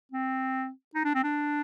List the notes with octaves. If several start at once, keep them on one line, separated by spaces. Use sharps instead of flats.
C4
D#4
D4
C4
D4